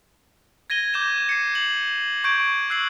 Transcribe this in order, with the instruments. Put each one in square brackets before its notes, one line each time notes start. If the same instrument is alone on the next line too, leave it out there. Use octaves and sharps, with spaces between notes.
[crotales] G#6 A#6 D#7 G7
D6 G6 G#6 E7
C7 C#7
F#7
C#6 G6 G#6 D7
E6 F#6 C7 F#7